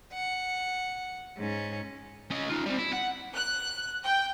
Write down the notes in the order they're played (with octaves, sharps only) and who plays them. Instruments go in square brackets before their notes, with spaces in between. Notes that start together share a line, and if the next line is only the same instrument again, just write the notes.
[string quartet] F#5
G#2 C#4
[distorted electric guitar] C#4 D#5
D#4 F4
G3 C4
E4
F#5
[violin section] F#6
G5